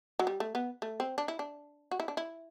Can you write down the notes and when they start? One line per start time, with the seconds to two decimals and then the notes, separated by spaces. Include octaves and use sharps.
0.19 F#3
0.27 G3
0.40 A3
0.55 B3
0.82 A3
1.00 C4
1.18 D4
1.28 E4
1.39 D4
1.91 F#4
2.00 E4
2.08 D4
2.17 E4